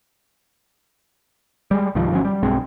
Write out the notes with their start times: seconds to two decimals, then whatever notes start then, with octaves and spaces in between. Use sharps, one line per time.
1.71 G3 G#3
1.95 C2 G2 D#3 F3
2.11 G#1 F3 F#3 C#4
2.25 G3
2.43 B1 G2 G#3 C4